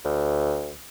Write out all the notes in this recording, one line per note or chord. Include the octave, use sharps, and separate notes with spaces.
D2